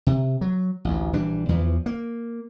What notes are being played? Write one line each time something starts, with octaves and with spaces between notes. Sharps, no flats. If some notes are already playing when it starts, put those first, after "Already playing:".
C3
F#3
A1 D2
A#1 E3 G3 D4
E2 E3 F3
A#3